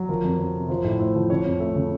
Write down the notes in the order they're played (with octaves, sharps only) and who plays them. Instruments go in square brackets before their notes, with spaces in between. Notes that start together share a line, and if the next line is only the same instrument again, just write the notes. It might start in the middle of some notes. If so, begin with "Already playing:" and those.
Already playing: [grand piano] F#3
F3 A#4
F2
F2
C3
F3 C5
A2
A3 C5
F3
C#3 C#5
F2
A3
C#3